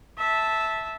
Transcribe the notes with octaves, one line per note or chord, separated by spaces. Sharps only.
E5 A5